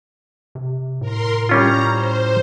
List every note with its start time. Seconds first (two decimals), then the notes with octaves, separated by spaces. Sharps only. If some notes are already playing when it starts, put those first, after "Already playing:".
0.55 C3
1.01 A2 A#4 C6
1.49 G3 C#4 F4 A#5
1.91 C5